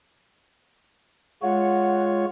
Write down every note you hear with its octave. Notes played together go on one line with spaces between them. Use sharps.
G#3 F4 C#5 F#5